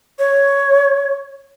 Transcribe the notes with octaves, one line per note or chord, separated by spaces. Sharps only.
C#5